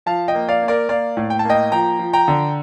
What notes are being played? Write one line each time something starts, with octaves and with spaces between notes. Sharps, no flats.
F3 F5 A5
D#5 G5
A#3
D5 F5
A#3
A#4 D5
A#3 D5 F5
A2
G5
A5
A#3 D#5 G5
F3 G5 A#5
F3
G5 A#5
D3